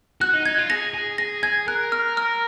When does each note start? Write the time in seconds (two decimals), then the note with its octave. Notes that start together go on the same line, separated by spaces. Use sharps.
0.21 F#4 F#6
0.33 D#4
0.46 D#4 G#6
0.58 F4
0.70 G#4 A#6
0.94 G#4
1.18 G#4 A#6
1.43 G#4 G#6
1.68 A#4 F#6
1.92 F6
2.17 F6